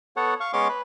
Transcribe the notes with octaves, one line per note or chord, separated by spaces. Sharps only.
B3 A4 C#5 F#5
F5 C#6
G#3 B3 C#4 C#5 C6 D6
B4